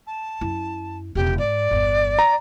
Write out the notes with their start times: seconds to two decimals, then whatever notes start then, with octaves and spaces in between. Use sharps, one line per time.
0.06 A5
0.41 F#2 E4
1.15 E1 C#3 G4
1.38 G#2 D5
1.71 G1 E2
2.19 A#5